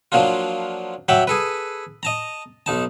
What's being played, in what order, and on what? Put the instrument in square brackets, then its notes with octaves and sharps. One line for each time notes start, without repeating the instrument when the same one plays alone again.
[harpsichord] F3 F#3 A#3 D4 F4
F#3 E5 F#5 G5 D6
G#4 A4 B4
D#5 A5 A#5
B1 D#4 A5